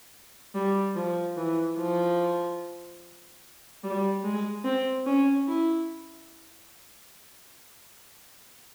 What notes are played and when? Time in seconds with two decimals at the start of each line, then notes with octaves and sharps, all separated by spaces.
0.55 G3
0.96 F3
1.37 E3
1.77 F3
3.84 G3
4.24 G#3
4.65 C4
5.06 C#4
5.47 E4